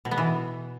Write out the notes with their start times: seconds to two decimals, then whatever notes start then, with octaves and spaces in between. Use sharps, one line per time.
0.05 B2
0.11 B3
0.18 E3